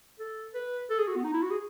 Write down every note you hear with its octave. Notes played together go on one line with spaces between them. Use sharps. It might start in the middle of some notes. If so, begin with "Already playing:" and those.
A4
B4
A4
G#4
F#4
B3
D#4
E4
F#4
G#4